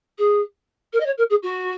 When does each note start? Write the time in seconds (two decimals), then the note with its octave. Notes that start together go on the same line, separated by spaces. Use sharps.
0.18 G#4
0.92 A#4
1.00 D#5
1.05 C#5
1.17 A#4
1.29 G#4
1.42 F#4